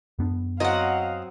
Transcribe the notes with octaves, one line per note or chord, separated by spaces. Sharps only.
F#2 B3 D4
F#3 C4 D#5 F5 F#5